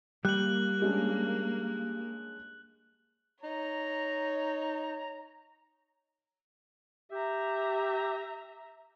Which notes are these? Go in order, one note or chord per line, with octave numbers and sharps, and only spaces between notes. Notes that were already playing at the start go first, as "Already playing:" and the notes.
G3 A#3 F#6 F#7
G#3 C#4 D4
D#4 C#5 A#5
G4 E5 A#5